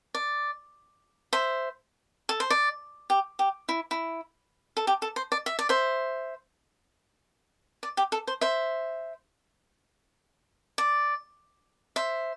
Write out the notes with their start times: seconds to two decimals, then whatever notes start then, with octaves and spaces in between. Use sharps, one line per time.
0.15 D5
1.33 C5 E5
2.29 A4
2.40 C5
2.50 D5
3.10 G4
3.39 G4
3.69 E4
3.91 E4
4.77 A4
4.87 G4
5.02 A4
5.16 C5
5.32 D5
5.46 E5
5.59 D5
5.69 C5 E5
7.83 D5
7.97 G4
8.12 A4
8.27 C5
8.41 C5 E5
10.78 D5
11.96 C5 E5